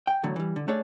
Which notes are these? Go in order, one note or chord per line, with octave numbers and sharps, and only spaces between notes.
G5
E2 A2 D3 F#3
E3 G3
D3
A3 D4 G#4 C#5 D5